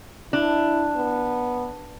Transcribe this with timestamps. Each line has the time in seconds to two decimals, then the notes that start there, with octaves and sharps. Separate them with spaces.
0.33 D4 E4
0.96 B3